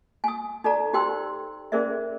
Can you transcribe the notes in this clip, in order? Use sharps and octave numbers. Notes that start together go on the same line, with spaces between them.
G#5 D#6
D#4 A4 D5 A#5
D#4 G4 C5 G5 C6 E6
C#4 G#4 A#4 C5 D5 E5